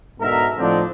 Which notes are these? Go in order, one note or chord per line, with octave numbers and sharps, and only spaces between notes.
G#2 B2 D3 A#4 E5 A#5
A2 D3 F3 C4 D4 D#4